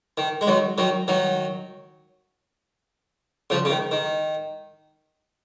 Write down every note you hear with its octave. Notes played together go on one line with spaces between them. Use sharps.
D#3
G#3
D#3 F#3
D#3 F#3
D#3 F#3
C#3 F3
C#3
D#3
D#3